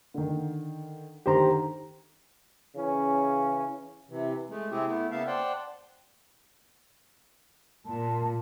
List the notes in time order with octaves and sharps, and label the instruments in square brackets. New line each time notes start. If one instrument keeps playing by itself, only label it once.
[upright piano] D3 D#3
[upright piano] D3 D#3 [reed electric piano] G4 C5 A#5
[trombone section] C#3 E3 C#4
[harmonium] C3 E3
G#3 A3
C3 C4 E4 G4 G#4
A3 B3 E4
C#3 A#3 B3 E5 F5 A5
C5 D5 F#5 G5 A5
[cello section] A#2 [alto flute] A5